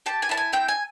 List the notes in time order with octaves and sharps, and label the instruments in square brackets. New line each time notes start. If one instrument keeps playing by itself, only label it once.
[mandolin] G4 A5
G#5
E4 A5
G#5
C4 G5
G#5